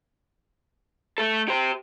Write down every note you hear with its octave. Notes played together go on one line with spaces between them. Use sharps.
A3 A4
G4 C5